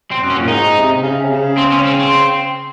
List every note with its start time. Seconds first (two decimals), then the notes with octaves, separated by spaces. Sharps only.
0.12 C4
0.20 F#2
0.30 C#4
0.38 A#2
0.48 G#2 D#4
0.76 C3
0.96 C3
1.02 C#3
1.24 C3
1.30 C#3
1.57 C4
1.71 C#4
1.85 C4
1.99 C4